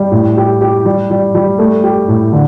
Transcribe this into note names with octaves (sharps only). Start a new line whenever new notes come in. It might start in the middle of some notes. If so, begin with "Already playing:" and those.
Already playing: G3
A2
G4
G4
G3
G3
G3
A3
G4
A2
D3